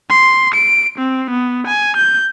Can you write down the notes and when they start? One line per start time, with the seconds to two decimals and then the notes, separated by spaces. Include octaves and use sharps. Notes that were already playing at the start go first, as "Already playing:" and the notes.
0.10 C6
0.54 D7
0.98 C4
1.31 B3
1.67 G#5
1.97 G6